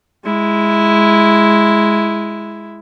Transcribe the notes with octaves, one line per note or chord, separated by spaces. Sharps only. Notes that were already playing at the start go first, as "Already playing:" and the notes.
G#3 E4